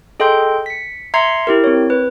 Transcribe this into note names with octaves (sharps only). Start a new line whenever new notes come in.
G#4 A4 D#5 G5 C6 G6
B6 C#7
E5 A#5 C6 G#6 C7 C#7
E4 G4 A#4
C4 C#5
B4